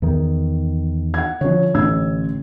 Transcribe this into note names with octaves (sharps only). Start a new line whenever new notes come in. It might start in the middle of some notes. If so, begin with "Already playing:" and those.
E2 D#3
F#5 G#6
D3 F3 C#4 C#5
A1 E6 G#6